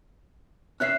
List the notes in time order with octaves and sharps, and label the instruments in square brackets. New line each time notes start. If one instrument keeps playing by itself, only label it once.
[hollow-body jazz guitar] C#4 C#5 E5 [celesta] F#6 C7